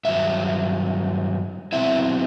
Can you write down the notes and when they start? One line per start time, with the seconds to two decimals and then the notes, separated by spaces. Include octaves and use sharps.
0.05 G2 D#3 F#3 E5
1.72 B2 F#3 C4 E4 E5